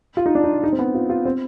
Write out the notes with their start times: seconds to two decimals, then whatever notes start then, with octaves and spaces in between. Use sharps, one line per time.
0.17 F4
0.26 D#4
0.35 D4
0.44 D#4
0.64 D#4
0.72 C4
0.79 B3
0.94 F4
1.09 F4
1.25 C4